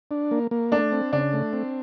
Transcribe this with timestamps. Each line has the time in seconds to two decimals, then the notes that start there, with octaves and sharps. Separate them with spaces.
0.11 D4
0.31 A#3
0.51 A#3
0.72 A3 D4
0.92 C4
1.12 C#3 D4
1.33 A3
1.53 C4